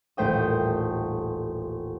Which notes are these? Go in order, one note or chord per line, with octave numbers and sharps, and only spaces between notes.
D#1 A1 A3 C5 G5 D#6